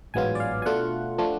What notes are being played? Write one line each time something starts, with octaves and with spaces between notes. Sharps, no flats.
A1 G#2 F#3 B3 F4 G#5
D5
F5
G#5
B2 A3 D4 F4 F#5
F3 A3 D4 F4